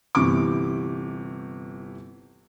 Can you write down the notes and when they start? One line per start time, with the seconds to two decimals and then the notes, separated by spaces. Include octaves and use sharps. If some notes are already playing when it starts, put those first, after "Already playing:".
0.15 G1 C3 E3 C#6 D6